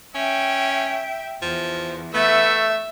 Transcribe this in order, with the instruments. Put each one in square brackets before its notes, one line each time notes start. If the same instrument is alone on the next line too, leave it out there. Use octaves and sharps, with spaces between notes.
[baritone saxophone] C#4 [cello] E5 G5
[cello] E2 [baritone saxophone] F3
[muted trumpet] A3 [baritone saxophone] B3 [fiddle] E5